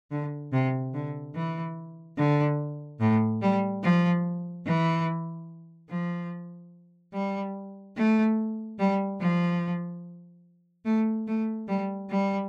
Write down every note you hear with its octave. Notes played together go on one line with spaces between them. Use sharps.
D3
C3
D3
E3
D3
A2
G3
F3
E3
F3
G3
A3
G3
F3
A3
A3
G3
G3